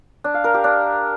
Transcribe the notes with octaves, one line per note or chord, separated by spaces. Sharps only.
D4
F5
A#4
G4
D4